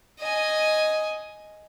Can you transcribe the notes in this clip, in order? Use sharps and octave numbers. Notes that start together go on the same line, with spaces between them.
D#5 G#5